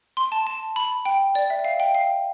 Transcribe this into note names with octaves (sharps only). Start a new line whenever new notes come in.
C6
A5
A5
B5
G5
D5
E5
F5
G5
F5